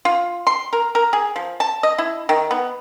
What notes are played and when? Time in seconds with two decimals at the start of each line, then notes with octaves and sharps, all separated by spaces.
0.05 F4
0.47 C6
0.73 A#4
0.95 A#4
1.13 G#4
1.36 F3
1.60 A5
1.83 D#5
1.98 E4
2.29 D#3
2.51 B3